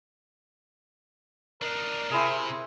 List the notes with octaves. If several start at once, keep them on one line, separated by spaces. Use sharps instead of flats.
D4 D#4 A#4
C3 C4 E4 G#4